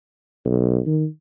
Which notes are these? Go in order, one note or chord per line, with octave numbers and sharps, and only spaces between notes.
B1
D#3